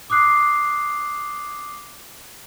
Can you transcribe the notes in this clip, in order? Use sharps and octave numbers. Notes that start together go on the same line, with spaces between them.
D6 D#6 F#6 C7